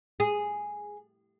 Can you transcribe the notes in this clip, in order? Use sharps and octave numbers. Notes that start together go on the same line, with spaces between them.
G#4